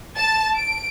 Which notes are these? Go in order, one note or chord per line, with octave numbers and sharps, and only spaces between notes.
A5
D7